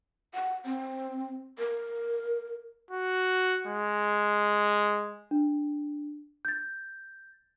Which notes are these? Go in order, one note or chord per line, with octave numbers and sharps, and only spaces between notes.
F#5
C4
A#4
F#4
G#3
D4
G6 A6